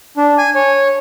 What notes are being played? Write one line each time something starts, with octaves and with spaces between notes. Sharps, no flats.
D4
G#5
C#5